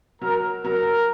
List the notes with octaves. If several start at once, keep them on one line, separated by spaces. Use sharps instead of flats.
F#3 A#4
F#3 A#4